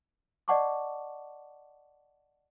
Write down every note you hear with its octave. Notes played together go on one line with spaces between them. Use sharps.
D5 D#5 F#5 A5 C#6 D6